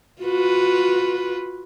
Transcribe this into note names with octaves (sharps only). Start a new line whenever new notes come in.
F4 F#4 B4